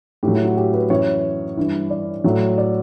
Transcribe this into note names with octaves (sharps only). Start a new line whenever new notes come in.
A2 F#3 G4
E4
F#4
G4
B4
F#2 E3 C#5
G2 E3
D5
A2 F#3
D5